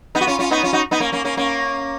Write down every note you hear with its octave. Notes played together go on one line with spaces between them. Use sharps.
B3 D#4
F#4
C#4 F4
C#4 F4
B3 D#4
C#4 F4
D#4 F#4
B3 D#4
A#3 C#4
A#3 C#4
A#3 C#4
A#3 C#4